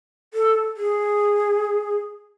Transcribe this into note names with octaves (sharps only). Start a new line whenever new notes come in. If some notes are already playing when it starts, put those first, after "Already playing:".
A4
G#4